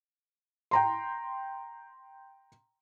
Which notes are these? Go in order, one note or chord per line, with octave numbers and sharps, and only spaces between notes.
G5 A#5 C6